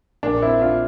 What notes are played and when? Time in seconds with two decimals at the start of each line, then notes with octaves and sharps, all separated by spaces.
0.23 A#1 A#2 A#3 D4
0.42 C4 E4
0.61 D4 F4